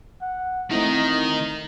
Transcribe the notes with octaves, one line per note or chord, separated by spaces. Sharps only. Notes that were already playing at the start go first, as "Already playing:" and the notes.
F#5
D#3 A3 C4 D#4 E4